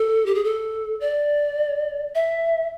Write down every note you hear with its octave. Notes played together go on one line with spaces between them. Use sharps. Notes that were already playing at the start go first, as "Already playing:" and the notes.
Already playing: A4
G4
G#4
A4
D5
E5